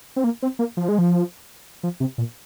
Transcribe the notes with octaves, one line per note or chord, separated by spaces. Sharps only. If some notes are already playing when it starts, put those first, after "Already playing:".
C4
A#3
C4
A#3
F3
G#3
F3
F3
C3
A#2